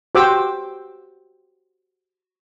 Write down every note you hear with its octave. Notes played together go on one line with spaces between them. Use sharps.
F#4 G4 C5 G5 D6 E6